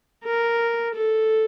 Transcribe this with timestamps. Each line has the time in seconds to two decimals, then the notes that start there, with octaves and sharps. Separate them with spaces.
0.24 A#4
0.95 A4